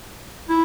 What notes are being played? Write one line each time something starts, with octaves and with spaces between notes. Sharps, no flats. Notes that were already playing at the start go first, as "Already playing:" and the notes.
E4